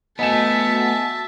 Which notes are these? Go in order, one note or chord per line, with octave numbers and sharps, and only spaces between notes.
A3 B3 F#4 D#5 E5 G#5 A5 E7